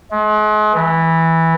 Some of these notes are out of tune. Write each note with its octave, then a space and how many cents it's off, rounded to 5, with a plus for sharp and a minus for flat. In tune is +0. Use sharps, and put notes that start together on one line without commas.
G#3 +40
E3 -10